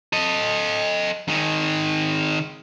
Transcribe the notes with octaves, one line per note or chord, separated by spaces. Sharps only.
A4 D#5
D#3 G#3